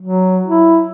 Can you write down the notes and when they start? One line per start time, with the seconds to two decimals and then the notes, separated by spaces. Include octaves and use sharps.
0.02 F#3
0.46 E4